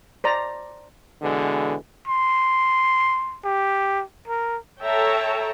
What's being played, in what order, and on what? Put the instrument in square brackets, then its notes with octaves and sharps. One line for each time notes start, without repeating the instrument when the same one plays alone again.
[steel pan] C5 D5 A#5
[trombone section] B2 D3 E3 G#3
[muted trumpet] C6
G4
A#4
[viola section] A4 C#5 E5 G5 A5 A#5